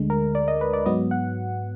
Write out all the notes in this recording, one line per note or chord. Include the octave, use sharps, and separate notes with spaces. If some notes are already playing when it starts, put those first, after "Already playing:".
Already playing: D2 D3 G#3
A#4
D5
D#5
B4
D5
G#2 F#3 B3 D#5
F#5